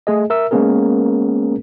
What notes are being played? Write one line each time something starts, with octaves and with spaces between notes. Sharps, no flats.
A3 G#4 D#5
A#4 E5 E6
G#3 A#3 B3 C#4 G#4 A#4